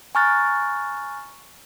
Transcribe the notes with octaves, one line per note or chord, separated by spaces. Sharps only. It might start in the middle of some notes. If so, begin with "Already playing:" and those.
G#5 A#5 C#6 F6 F#6 A6